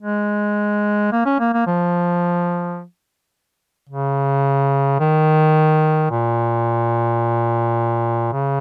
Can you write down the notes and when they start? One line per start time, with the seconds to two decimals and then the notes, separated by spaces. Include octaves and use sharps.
0.01 G#3
1.12 A#3
1.26 C#4
1.40 A#3
1.53 A#3
1.67 F3
3.89 C#3
5.00 D#3
6.11 A#2
8.33 C#3